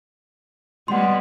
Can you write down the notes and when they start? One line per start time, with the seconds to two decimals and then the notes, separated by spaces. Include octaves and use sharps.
0.88 G3 G#3 B3 F#5 C6